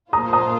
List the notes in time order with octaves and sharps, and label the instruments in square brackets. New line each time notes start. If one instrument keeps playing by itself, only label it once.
[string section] A#2 A#3 F4 C5 [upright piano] A#5 D#6
[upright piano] A#5 D#6